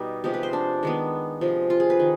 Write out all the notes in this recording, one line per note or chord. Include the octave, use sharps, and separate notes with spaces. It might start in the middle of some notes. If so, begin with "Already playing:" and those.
Already playing: B2 G3 D#4
C3 F3 G#3 B3 G4
B4
C5
D4
D#3 G#3 B3
C3 F3 G#3
F4
G#4
B4
D#3